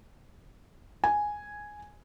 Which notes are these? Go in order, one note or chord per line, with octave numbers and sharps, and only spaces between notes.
G#5